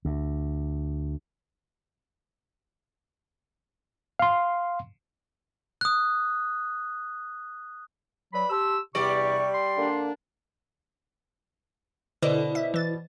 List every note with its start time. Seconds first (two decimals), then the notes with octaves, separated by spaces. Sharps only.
0.05 D2
4.19 F5 C6
5.81 D#6 F#6
8.33 F#3 B4 D5 B5
8.50 G4 A5 C6 E6
8.95 E2 G2 C3 G3 D5 C#6
9.54 C6
9.78 D3 A#3 D4
12.23 B2 D3 E4 B4 C5 D5 D#5
12.55 E5
12.74 E3 A6